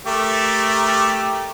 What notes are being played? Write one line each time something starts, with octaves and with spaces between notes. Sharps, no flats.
A3 G4 A#4